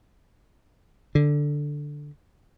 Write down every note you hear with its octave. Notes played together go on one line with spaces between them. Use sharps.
D3